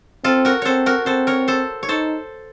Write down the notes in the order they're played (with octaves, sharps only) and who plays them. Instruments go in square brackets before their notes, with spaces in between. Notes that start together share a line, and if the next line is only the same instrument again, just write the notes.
[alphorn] C4 [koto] F4 A4
[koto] F#4 A#4
[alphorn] C4 [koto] A4 C5 C#5
[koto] F#4 A#4
[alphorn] C4 [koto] A4 C5
[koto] A#4 C#5
A4 C5
C#5
[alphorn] D#4 [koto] A4 C5